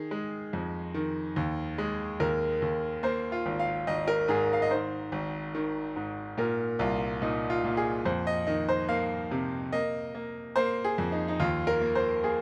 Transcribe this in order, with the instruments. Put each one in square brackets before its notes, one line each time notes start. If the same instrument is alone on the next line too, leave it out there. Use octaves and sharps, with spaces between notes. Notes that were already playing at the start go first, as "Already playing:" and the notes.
Already playing: [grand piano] D#3 G#4
G#3
F2
D#3
D#2
G#3
D#2 A#4
D#2
A#3 C5
F4
G#1
F5
G#1 D#5
A#4
G#2 G#4
F5
D#5
D#3 C5
G#1
D#3
G#2
A#2 A#4
C2 F4
A#2 D#4
F4
A#2
G#4
F2 C5
D#5
D#3 D#5
C5
A#3 F5
C3
A#3 D#5
A#3
A#3 C5
G#4
F2
D#4
D#4
D#2 F4
A#4
A#3
C5
A#3 G#4